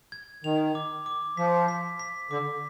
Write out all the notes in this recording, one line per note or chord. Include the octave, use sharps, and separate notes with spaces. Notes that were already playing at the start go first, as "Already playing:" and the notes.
G#6
D#3 F7
D6
D6
F3 B6
B6
B6
D3 D6